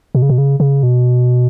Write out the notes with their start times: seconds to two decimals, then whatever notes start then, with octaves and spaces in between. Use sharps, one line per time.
0.15 B2
0.22 C#3
0.29 B2
0.38 C#3
0.60 C#3
0.83 B2